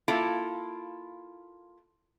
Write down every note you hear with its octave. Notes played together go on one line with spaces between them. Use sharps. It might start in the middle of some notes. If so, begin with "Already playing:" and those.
A#3 E4 F4 A4